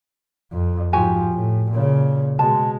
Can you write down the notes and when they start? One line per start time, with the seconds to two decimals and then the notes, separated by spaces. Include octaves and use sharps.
0.52 F2
0.93 G#2 F3 F#4 G4 G#5
1.33 A2
1.71 A#2 C#3
2.39 B2 G#3 A5